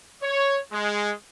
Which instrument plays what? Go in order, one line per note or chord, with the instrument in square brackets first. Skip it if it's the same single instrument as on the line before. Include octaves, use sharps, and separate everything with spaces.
[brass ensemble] C#5
G#3